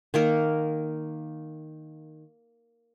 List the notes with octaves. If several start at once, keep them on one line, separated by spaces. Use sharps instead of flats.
D#3 A#3 A#4